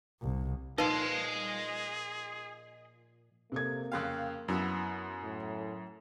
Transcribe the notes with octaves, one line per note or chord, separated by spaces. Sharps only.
C2
A#2 F3 D#4 G#4 B4 D#5 C6
C3 A#3 A4 G#6
F2 C#3 F5 G5 C6 F#6
F#2 B3 E4
A2